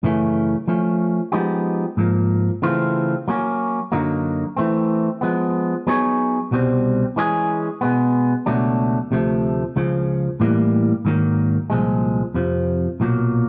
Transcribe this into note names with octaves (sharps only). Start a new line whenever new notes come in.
F#2 C#3 E3 A3 C#4
F3 A3 C#4
F3 G#3 B3 D#4 G4
G#2 F3 A#3
C#3 E3 A3 C4 F4
F#3 A#3 C#4
F#2 D3 F#3 A#3 D#4
E3 A3 C4
F3 G#3 B3
F#3 B3 D#4 G#4 C#5
C2 B2 G3 C4
E3 G#3 C#4 E4 G#4
B2 G#3 B3
C#2 B2 F#3 A3 D4
D2 C3 F3 A3
C#2 C#3 F3
A2 E3 G3 A#3
G#2 D#3 F#3 A#3
C2 A#2 F3 G#3
F2 C3 F3
B1 A#2 F#3 A#3